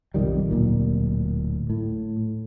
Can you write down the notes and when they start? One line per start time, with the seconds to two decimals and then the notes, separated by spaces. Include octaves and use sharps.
0.14 B1 F2 D#3 G3
0.51 D1 A#2
1.70 A2